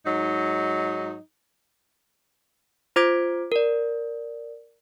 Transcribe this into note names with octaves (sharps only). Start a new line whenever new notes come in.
G#2 F#3 D#4
F4 C5 D6 G#6 B6 D7
A#4 D5